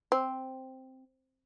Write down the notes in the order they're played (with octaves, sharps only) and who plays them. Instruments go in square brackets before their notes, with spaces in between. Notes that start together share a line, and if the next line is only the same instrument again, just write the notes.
[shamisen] C4